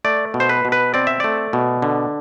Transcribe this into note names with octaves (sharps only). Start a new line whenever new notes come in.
A3 D5
B2
C5
B4
B2
B4
C4 D5
E5
A3 D5
B2
D3